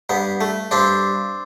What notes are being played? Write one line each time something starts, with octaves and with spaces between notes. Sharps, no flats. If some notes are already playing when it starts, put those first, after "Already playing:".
G2 B3
A3
G2 C4 D4